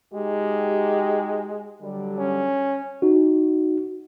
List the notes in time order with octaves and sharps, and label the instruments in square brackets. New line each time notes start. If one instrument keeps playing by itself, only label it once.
[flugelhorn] G#3 [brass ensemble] D#4 F#4 G4
[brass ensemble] D3 F#3 G3
[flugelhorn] C#4
[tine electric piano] D#4 F#4